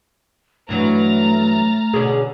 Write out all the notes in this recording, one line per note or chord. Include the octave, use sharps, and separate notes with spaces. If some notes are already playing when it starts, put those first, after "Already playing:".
G2 E3 F#3 A3 A#5 F6 A6
B2 D3 C#4 G#4